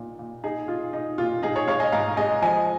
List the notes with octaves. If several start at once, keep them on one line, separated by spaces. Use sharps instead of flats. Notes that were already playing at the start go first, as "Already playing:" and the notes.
Already playing: A#2 D#4
A#2
D#4 G#4
D#4 F4
D#4
A#2 F4
G#2 D#4 G#4
G#4 C#5
G#3 C#5 F5
D#5 G#5
G#2 F5 A#5
G#3 D#5 G#5
F3 D#5 G#5